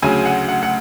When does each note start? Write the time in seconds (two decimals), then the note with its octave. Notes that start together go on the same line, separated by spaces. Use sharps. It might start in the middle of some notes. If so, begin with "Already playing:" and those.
0.02 D2 C#3 F#3 G#5
0.26 F#5
0.49 F#5
0.63 F#5